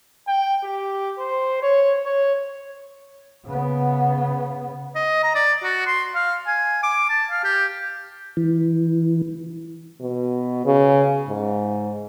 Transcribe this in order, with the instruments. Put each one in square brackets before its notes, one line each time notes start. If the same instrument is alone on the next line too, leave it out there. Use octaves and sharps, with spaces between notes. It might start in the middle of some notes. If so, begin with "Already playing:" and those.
[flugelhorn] G5
G4
C5
C#5
C#5
[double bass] C#3 B3
[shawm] D#5
A#5
D5
F#4
C6
F5
G#5
D6
A5
F5
G4
[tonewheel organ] E3
[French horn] B2
C#3
G#2